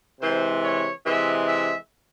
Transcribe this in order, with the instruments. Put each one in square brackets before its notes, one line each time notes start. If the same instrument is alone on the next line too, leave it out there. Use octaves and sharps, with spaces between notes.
[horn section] C3 E3 G#3 C5
C#5
C3 E3 G#3 E5
E5